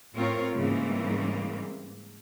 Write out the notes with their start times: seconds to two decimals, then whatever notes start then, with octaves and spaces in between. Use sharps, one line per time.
0.15 A2 C4 F4 A#4 C#5
0.55 G#2 C#3 E3 G3 A#3 C4